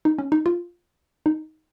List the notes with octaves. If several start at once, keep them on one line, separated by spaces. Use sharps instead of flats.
D#4
C#4
D#4
F4
D#4